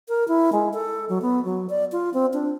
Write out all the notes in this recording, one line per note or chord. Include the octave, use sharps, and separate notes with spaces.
A#4
E4
G#3
A4
F#3
B3
F#3
D5
F4
C4
D4